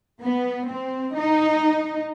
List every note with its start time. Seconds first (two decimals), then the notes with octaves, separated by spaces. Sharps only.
0.22 B3
0.69 C4
1.15 D#4